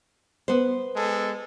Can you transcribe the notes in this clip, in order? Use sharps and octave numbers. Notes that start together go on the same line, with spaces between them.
B3 C5
G#3 A4